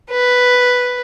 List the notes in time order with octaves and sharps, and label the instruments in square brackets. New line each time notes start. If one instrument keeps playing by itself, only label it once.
[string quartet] B4